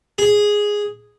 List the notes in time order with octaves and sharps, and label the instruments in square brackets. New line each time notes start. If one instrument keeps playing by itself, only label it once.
[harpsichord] G#4